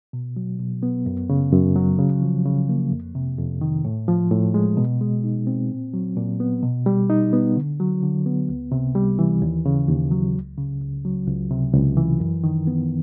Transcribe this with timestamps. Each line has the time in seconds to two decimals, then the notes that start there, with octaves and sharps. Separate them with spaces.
0.13 B2
0.36 F#3
0.59 B2
0.83 B3
1.06 F#2
1.30 C#3
1.53 F#2
1.76 F#3
1.99 C#3
2.22 F3
2.45 C#3
2.69 A#3
2.91 F2
3.15 C3
3.38 F2
3.61 D#3
3.85 A2
4.08 F3
4.31 A2
4.54 G#3
4.77 B2
5.01 G#3
5.24 D#4
5.47 C4
5.71 A#2
5.94 F#3
6.17 A#2
6.40 B3
6.63 B2
6.86 G3
7.10 D#4
7.33 B3
7.56 D3
7.80 F#3
8.02 D3
8.26 B3
8.49 C#2
8.72 C3
8.95 G3
9.19 E3
9.42 D#2
9.66 C#3
9.88 D#2
10.11 F#3
10.35 C#2
10.57 C#3
10.81 C#2
11.05 F#3
11.27 C#2
11.51 C3
11.74 C#2
11.97 E3
12.20 F#2
12.44 D#3
12.67 B3